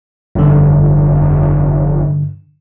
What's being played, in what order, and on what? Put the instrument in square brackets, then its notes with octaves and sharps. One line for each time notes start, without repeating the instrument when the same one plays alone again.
[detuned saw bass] F1 [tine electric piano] G2 D3